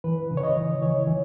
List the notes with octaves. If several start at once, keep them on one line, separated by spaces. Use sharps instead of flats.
E3 B4
C#3
C#5
D#5
E3
E3 C#5
E3